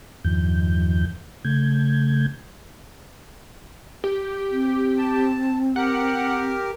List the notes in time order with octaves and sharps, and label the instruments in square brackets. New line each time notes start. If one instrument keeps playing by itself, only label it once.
[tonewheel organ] E2 G2 D#3 F3 G6
C#3 A3 G6 G#6
[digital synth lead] G4
[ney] C4
[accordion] A5
[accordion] G4 A#4 [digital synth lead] F#5